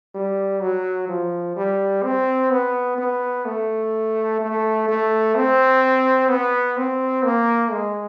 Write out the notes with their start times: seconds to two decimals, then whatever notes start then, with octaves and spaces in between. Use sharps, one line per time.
0.15 G3
0.62 F#3
1.09 F3
1.56 G3
2.03 C4
2.51 B3
2.98 B3
3.45 A3
4.41 A3
4.89 A3
5.36 C4
6.30 B3
6.77 C4
7.24 A#3
7.72 G#3